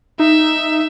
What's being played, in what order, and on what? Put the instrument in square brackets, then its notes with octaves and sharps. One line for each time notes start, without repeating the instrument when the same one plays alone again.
[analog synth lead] D#4 [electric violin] E5